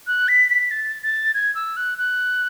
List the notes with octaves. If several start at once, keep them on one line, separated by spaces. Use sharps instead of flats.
F#6
B6
B6
A6
A6
G#6
E6
F#6
F#6